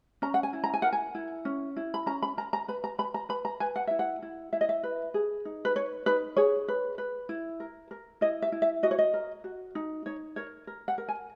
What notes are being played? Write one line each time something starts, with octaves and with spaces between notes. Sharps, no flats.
C#4 A#5
F#5
G#5
E4
A#5
G#5
A#4 F#5
G#5
E4
C#4
E4
B5
C#4 A#5
B5
A#4 A#5
A#5
B4 B5
A#5
B4 B5
A#5
B4 B5
A#5
B4 G#5
F#5
E4 E5
F#5
E4
E4 E5
D#5
E5
B4
G#4
D#4
B4
B4 C#5
D#4 B4
G#4 C#5
B4
B4
E4
A#4
A#4
E4 D#5
E5
E4
E5
F#4 D#5
C#5
D#5
A#4
F#4
D#4
D#4 C#5
A#4 C#5
A#4
F#5
A#4
G#5